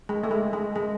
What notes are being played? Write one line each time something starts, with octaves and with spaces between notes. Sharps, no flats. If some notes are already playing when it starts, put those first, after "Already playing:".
G#3
A3
G#3
G#3
G#3